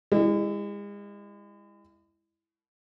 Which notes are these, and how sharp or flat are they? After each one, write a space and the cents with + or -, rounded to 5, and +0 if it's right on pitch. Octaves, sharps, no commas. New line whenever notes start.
G#3 -35 E4 +0